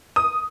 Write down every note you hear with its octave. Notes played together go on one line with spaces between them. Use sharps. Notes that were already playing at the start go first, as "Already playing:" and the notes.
D#6